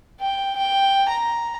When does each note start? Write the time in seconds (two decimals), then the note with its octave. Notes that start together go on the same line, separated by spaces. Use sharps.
0.21 G5
0.56 G5
1.09 A#5